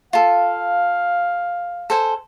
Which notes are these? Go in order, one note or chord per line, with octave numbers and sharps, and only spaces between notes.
F4 A4 F5
A4 C5 G#5